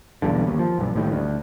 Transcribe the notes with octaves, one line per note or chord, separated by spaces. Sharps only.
B1 E2 G2 D3
D#2
F3
B1 G2
A2 D#3 G3
D2